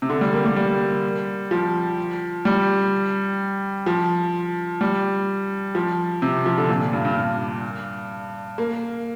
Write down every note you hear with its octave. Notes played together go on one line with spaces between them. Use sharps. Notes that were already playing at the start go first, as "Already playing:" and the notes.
C3
D3
G3
A#3
G3
G3
F3
G3
F3
G3
F3
C3
F3
D3
A#2
G2
G2
G2
A#3